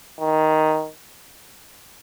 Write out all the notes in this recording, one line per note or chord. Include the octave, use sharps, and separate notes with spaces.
D#3